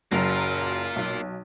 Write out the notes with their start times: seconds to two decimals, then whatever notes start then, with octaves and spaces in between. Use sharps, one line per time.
0.12 F#1 F#3 A#3 F4
0.96 B1